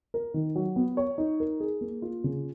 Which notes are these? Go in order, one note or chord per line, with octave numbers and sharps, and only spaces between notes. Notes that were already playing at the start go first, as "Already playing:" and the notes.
A#4
D#3
F#3
B3
C#5
D#4
A#4
G#4
A#3
F4
C#3